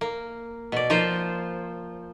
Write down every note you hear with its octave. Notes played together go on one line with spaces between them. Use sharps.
A#3
B2 D5
F3 A#3 F4 C5